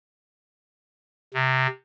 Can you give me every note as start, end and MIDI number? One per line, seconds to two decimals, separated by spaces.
1.34 1.67 48